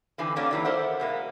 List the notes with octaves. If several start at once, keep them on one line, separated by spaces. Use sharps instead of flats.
D3 E3 C4 B4 G#5
A3 A#3 C#4 D4 F#4
C3 E3 F#3
A4 A#4 C5 D5 E5 F#5
B2 G#3 A#3